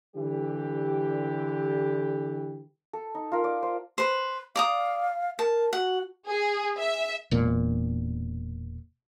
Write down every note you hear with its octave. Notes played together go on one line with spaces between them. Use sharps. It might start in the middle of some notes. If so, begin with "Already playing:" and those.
D3 E3 G3 G4
A4
D#4
F4 A#4
D5
C5
B4 C5
D5 F5 A#5 D#6
A#4 A5
F#4 F#5
G#4
E5
E1 A#2